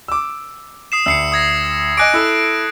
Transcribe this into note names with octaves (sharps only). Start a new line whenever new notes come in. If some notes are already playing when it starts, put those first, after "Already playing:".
D6 E6
D#6 C7 E7
D2 E6 C7 C#7
D#6 G#6 A#6
D#5 G#5 D6 F#6 A#6 D7
E4 A4 E6